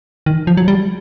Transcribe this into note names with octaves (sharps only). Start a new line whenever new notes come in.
D#3
F3
F#3
G3